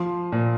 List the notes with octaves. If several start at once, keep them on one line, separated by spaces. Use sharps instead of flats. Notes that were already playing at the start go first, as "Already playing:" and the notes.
Already playing: F3 C6
A#2